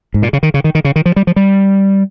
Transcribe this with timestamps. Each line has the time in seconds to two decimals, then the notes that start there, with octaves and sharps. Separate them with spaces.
0.14 G#2
0.22 A#2
0.33 C#3
0.43 D#3
0.54 C#3
0.64 D#3
0.75 D#3
0.85 C#3
0.96 D#3
1.06 F3
1.16 G3
1.27 F3
1.36 G3